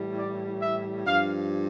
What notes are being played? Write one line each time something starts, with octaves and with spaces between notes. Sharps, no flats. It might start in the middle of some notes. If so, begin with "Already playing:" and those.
Already playing: A2 E3 G3
D5
E5
G2 F3 F5